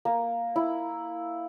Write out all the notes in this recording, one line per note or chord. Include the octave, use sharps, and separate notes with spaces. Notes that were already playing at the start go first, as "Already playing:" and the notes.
A#3
E4